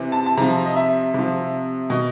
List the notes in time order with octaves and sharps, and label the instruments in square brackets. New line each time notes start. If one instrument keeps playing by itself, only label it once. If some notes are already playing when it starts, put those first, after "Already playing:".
Already playing: [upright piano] C3 E3
A5
A5
C3 F3 A#5
D#5
E5
C3 F3
B2 D#5